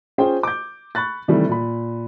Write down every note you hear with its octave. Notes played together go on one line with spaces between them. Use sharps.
C#4 F4 G#4 C5 G5
D6 G6
B5 C#6 F#6 A6
C3 D#3 E3 G3 A3
A#2 B5